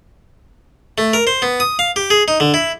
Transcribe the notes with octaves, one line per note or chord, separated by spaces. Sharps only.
A3
A#4
C5
B3
D#6
F5
G4
G#4
D#4
D3
E4